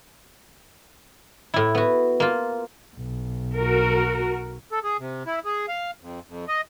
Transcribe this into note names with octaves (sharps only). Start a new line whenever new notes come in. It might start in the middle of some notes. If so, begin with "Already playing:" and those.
A2 E4
B3 F#4
A#3 F4
B1
F#4 A#4
A4
G#4
C3
E4
G#4
F5
F2
F2
D#5